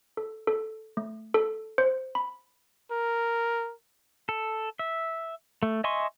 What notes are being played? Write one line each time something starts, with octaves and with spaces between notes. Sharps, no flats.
A4
A4
A3
A4
C5
B5
A#4
A4
E5
A3
D#5 E5 G#5 C6 C#6